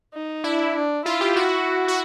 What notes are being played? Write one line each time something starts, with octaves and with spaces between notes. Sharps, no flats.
D#4
D4 E4
D4
E4 F4
G4
F#4
F#4